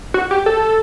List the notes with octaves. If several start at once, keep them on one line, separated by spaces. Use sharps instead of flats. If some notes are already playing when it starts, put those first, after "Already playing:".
F#4
G4
A4